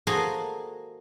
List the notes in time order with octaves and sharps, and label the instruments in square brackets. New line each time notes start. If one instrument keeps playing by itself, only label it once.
[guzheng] A#3 F#4 G#4 A4 C5 D#5